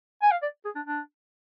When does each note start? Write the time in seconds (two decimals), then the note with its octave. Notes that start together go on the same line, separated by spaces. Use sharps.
0.22 G#5
0.31 F5
0.42 D5
0.65 G#4
0.75 D4
0.87 D4